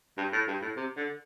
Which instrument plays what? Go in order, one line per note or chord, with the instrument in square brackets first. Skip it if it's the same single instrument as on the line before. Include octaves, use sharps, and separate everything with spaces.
[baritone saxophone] G2
A2
G2
A2
C3
D3